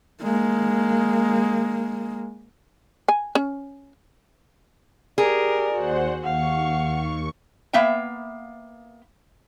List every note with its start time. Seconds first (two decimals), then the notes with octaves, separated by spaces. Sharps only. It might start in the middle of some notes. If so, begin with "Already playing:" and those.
0.22 G#3 A#3
3.08 G#5
3.35 C#4
5.18 G4 G#4 A#4 D5
5.74 D#2 F#4 C5 F#5
6.24 D#2 F5 F#5 C#6
7.73 A#3 B3 E5 F5 G5